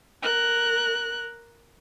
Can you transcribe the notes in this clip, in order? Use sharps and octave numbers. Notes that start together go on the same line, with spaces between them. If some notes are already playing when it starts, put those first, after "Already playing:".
A#4 F#6